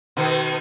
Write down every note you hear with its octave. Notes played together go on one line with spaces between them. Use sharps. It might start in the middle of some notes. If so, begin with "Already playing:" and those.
B2 D#3